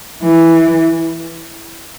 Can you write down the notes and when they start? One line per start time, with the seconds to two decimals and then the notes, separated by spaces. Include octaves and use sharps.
0.22 E3